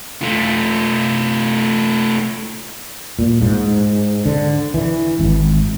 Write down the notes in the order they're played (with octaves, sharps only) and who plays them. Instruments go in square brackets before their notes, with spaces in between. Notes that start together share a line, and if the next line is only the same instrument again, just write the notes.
[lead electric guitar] A3 F4
[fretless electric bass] A#2
G#2
D3
E3
G#1